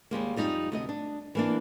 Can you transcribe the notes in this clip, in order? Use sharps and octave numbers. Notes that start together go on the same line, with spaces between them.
D#2 G3 G#3 A#3
F2 G3 D#4 D#5
D2 C3 D#5
D4
E3 A#3 D4